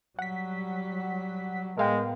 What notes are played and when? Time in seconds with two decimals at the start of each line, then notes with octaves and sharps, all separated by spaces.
0.19 F#3 G3 F#5 B6
1.78 A2 G#3 B3 A#4 F5 G5